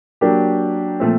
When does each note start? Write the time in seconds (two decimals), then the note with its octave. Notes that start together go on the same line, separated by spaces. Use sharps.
0.21 F#3 A#3 D4 G4
1.00 A#2 F3 A3 C4